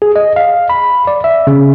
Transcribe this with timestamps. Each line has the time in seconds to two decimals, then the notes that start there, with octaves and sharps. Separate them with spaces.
0.02 G#4
0.16 D#5
0.36 F5
0.70 B5
1.07 D5
1.24 E5
1.47 C#3